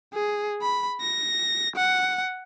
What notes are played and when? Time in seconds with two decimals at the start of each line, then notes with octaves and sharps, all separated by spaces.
0.14 G#4
0.62 B5
1.01 A#6
1.75 F#5